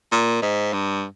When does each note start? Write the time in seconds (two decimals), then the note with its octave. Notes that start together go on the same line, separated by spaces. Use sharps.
0.12 A#2
0.42 G#2
0.73 G2